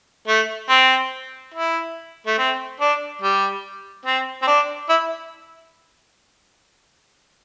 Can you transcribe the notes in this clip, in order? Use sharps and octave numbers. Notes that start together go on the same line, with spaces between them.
A3
C4
E4
A3
C4
D4
G3
C4
C4
D4
E4